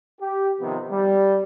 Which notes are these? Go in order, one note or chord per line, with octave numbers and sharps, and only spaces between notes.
G4
C3 D#3 F3 B3
G3